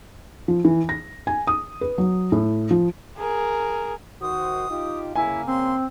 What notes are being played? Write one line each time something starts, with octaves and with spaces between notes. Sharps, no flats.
F3
E3
A#6
G#5
D#6
B4
F#3
A2
F3
G#4 A#4
D#3 F#4 C5 D#6
D#4 F4 G4
C#3 A#3 E4 G#5
C4 C6